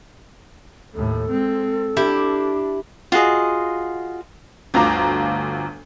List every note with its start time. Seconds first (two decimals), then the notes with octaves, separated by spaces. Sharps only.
0.94 D#2 A2 A4
1.30 G#3 C4
1.97 D4 E4 G4
3.12 F4 F#4 G#4 D#5
4.74 G1 D2 F4 A#5 D6